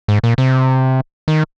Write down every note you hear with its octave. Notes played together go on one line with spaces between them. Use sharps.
G#2
A#2
C3
D#3